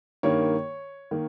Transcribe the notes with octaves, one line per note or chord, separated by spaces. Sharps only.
G2 D#3 A#3 C#5
D#3 A#3